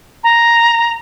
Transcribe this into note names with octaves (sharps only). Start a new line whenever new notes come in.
A#5